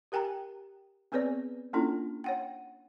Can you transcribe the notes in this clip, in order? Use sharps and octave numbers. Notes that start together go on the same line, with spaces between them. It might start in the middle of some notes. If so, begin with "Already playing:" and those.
G4 A#4 G5 G#5 A#5
B3 C4 G#4 B4 C#5 D5
A#3 C#4 D4 E4 F4 A4
C#5 F#5 G5